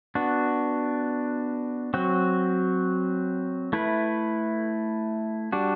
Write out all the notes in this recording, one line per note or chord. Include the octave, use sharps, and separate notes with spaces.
B3 D4 F#4
F#3 C4 F#4
A3 E4 B4
G3 D4 F#4